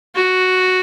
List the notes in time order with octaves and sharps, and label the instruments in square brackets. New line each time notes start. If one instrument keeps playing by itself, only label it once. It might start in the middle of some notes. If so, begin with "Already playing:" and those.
[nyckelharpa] F#4